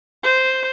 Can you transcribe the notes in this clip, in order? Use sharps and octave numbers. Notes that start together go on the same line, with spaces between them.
C5